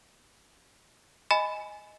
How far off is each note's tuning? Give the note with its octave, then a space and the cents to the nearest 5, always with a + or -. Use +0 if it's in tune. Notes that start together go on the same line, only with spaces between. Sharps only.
D#5 +0 G#5 +0 B5 +15